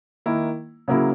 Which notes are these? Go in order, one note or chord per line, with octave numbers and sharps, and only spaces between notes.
D#3 A#3 E4
C#3 F#3 A#3 E4